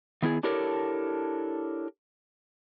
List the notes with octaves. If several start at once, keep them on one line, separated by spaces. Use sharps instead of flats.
D#3 B3 E4 G#4
D4 E4 G4 A4 A#4 C#5